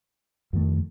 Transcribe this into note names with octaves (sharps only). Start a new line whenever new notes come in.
F2 D#3 A3